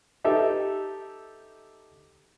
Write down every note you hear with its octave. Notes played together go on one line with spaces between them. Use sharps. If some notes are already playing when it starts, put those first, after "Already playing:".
D#4 G4 A4 E5